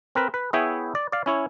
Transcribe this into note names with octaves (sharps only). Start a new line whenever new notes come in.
C4 A#4 B4
B4
B3 E4 G#4 C#5 E5 G5
D5
D5 F5
C#4 E4 C#5